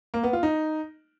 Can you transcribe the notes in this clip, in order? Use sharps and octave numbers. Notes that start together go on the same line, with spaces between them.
A#3
B3
F4
D#4